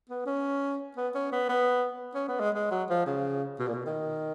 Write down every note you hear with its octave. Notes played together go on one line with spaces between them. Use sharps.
B3
C#4
B3
C#4
B3
B3
C#4
B3
G#3
G#3
F#3
F3
C#3
B2
A#2
B2
D#3